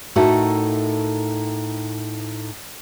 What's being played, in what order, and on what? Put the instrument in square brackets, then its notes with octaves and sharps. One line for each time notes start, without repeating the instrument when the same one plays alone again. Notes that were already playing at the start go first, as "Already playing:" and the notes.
[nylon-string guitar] A2 D#4 F#4 A4 A#4 E5